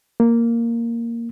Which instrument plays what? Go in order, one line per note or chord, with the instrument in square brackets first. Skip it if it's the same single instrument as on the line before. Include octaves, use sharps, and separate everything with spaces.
[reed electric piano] A#3